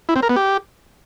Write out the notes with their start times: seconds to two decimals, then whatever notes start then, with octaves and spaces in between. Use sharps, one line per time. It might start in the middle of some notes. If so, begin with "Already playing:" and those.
0.09 E4
0.16 C4
0.23 A#4
0.29 B3
0.36 G4